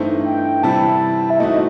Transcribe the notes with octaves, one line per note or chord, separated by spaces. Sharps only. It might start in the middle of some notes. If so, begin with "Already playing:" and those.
Already playing: G2 E3 A3 C4 D#4
G5
C3 E3 G3 C4 E4 A5
E5
E3 A3 C4 D#4 F#4 D#5